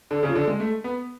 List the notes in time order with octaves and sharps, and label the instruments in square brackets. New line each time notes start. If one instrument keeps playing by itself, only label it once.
[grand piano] D3
C#3
F3
D3
G#3
A3
B3